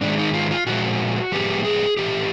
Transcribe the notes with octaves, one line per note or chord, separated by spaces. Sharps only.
G#2 D#3 G#3 D4
D#4
F4
F4
A#2 F3 G#3 F#4
A2 F3 G#3 B3 G4
G#4
A2 E3 A3 G4